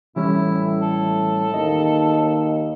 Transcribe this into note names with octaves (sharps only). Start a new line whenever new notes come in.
A2 E3 G3 C#4 E4
A4
D#2 D#5